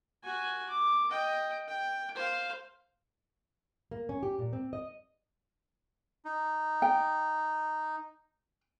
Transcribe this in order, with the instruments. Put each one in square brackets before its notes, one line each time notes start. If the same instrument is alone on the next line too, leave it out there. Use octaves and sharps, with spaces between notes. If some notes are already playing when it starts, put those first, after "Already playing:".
[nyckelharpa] F#4 G#5
D6
D#5 G5
G5
C5 F5
[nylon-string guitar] A#3
C#4
G4
A#2
C4
D#5
[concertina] D#4
[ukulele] G5